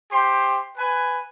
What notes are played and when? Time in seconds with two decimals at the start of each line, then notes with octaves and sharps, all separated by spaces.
0.11 G4 C5 C6
0.78 B4 G#5